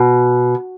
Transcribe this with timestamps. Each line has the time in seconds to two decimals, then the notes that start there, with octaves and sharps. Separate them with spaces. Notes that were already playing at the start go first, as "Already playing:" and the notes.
Already playing: B2